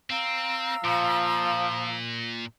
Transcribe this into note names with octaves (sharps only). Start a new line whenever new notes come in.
C4 F5 A#5 E6
A#2 F3